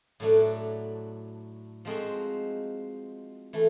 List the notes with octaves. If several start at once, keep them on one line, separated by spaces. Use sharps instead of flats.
A2 F#3 A3 D4
F3 G#3 C4 D#4 F#4
E3 A3